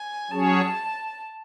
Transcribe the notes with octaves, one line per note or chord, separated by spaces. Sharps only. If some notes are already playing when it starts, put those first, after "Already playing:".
Already playing: G#5
F#3 C#4 G#4 C#5 A5